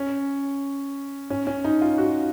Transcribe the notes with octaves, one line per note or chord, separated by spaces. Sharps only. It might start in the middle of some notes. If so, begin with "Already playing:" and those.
Already playing: C#4
C#4
C#4
D#4
F4
F#4